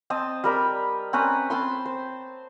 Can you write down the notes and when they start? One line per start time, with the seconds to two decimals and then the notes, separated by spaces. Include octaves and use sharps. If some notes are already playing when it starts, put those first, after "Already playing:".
0.10 C4 D#5 A5
0.44 G3 A#4 B5
1.13 C4 C#4 B4 A#5
1.50 C4 A5 B5 C6
1.85 C5